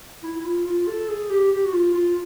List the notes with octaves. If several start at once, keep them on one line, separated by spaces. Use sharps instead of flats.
E4
E4
F4
F4
A4
G#4
G4
G4
F#4
F4
F4